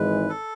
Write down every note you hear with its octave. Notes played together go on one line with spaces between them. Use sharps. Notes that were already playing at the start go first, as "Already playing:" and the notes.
Already playing: G#1 G#2 E3 G#3 B4
A4